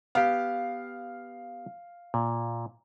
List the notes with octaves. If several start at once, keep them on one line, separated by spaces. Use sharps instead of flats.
B3 G4 F5
A#2